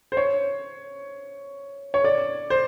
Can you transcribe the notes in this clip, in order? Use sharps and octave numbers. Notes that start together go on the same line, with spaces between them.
C5
C#5
C#5
D5
C5